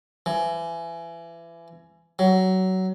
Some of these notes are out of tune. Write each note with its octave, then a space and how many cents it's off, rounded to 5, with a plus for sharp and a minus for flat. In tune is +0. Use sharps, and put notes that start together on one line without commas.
E3 +30
F#3 +20